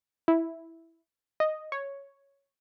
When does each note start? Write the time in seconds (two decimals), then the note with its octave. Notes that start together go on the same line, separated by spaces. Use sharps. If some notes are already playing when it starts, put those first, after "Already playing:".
0.28 E4
1.40 D#5
1.72 C#5